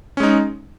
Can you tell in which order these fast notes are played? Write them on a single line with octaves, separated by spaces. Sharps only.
C#4 G#3 D#4